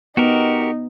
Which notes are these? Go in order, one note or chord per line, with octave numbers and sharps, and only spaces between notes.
B3 D#4 F#4 G4 A#4